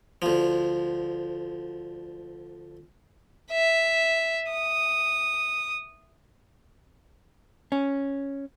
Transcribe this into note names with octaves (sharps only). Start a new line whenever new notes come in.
D2 F3
E5
D#6
C#4